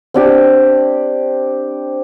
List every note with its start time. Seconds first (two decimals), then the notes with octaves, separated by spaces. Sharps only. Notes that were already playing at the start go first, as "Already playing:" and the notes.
0.14 C4 D4 G4